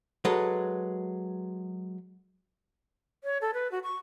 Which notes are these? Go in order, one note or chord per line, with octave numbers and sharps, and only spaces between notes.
F#3 G#3 A4 B4
C#5
A4
B4
F#4
C#6